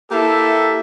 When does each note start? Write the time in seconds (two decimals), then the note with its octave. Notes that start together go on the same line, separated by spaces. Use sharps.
0.12 A#3 E4 G4 A4 E5